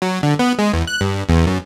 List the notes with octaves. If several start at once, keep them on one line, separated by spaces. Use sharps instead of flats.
F#3
D3
B3
G#3
E2
F#6
G2
E2
F#2